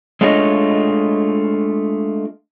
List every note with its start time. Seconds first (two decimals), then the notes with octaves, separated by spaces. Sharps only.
0.21 G#3 A3 D4 F4 C#5 D#5